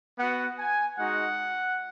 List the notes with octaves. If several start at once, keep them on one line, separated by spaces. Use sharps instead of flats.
B3 F#4 F#5
G#5
G#3 D#4 F#4 F#5